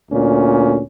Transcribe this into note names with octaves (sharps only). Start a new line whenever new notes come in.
D2 A#2 C#4